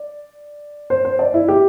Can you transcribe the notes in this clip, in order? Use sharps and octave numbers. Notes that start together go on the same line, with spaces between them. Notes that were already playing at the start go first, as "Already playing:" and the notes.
Already playing: D5
C5
C5
D5
E4
G4